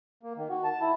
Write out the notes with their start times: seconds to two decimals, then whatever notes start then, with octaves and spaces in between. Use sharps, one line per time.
0.23 A#3
0.37 D#3
0.49 F#4
0.64 A5
0.81 E4